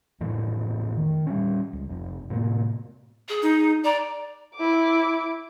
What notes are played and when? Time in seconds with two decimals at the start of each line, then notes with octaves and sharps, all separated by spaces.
0.20 F2 A2 E3 A3
0.97 D#3
1.27 G3 B3 C#4
1.73 C#2
1.89 F1
2.30 A2 C3 A#3
3.28 G#4
3.43 D#4
3.84 D5 A#5
4.55 E4 D6